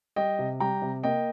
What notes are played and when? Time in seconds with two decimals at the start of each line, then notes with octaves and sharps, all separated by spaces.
0.16 G3 D#5 G5
0.39 C3
0.60 G3 G5 A#5
0.82 C3
1.03 A#3 D#5 G5